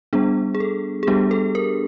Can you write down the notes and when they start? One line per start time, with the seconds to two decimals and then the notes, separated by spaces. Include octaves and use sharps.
0.13 G3 B3 D4 G#4
0.55 G#4
0.60 A4
1.03 G#4
1.07 G3 B3 D4 G4
1.31 A4
1.55 A#4